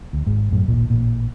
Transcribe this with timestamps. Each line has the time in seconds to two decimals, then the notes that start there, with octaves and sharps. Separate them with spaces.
0.13 D2
0.27 G#1 G#2
0.51 F#2 A2 F#3
0.68 D#1 A1 A#2
0.90 A1 A#2